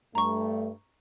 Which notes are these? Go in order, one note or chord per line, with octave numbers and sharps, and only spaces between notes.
G2 A3 A#5 C#6